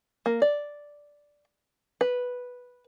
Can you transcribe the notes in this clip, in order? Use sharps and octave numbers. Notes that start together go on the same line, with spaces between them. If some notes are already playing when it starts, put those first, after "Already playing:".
A#3
D5
B4